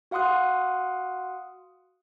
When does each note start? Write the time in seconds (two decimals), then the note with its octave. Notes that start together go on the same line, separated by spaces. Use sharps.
0.11 F#4 F5 F#5 C6 D#6 F#6